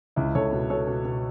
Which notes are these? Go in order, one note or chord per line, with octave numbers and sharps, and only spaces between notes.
C#2 E4
C#2 A4 C#5
B2
B2 A4 C#5
B2
B2